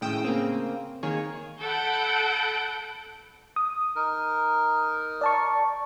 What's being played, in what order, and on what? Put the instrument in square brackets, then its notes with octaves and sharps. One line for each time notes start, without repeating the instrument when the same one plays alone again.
[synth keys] G#1 A2 C#3 G5 D#6 E6
C#3 A#3 C4
D#3 A#3 G#4 C#5
[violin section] A4 F#5 B5 G6 D7
[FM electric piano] D#6
[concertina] D#4 A#4
[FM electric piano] D5 A5 C#6